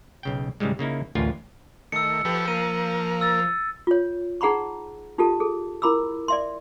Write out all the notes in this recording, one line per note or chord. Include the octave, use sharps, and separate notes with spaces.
B1 C#3 G5
G#2 C#3 E3 G3 G#3
C#3 A#3 D#4 E4
A1 D2 F4 A#4 B4 G#5
D#3 A3 E6 C#7
F3 G4 A4 B4
A#3 A#4 D#7
E6 A6
F4 C#5
D#4 G#4 F#5 A#5 B5 C#6
D#4 F4 G4 A4 A5
G#4 A4
E4 A#4 B5 D6 E6
D5 E5 C6